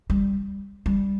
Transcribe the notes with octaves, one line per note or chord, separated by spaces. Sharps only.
G3
G3